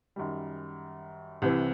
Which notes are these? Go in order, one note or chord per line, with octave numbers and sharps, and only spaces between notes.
F#2 D#3 G3
C2 C3 E3